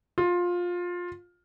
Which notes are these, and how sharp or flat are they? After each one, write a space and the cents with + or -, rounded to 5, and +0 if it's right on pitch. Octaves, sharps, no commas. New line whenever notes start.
F4 +15